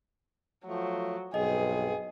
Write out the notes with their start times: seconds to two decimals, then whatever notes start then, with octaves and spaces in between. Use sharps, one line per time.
0.66 F3 F#3 A3
1.34 B1 G2 C4 G#4 D#5